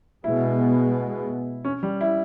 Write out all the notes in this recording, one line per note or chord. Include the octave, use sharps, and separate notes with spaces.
B2 G#3 B3 E4
C#4
G3
E4